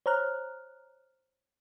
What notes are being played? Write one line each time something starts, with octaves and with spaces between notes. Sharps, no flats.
C5 C#5 A#5 F6 F#6